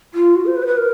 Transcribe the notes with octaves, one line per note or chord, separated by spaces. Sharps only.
F4
F#4
C5
B4
C5
B4
A#4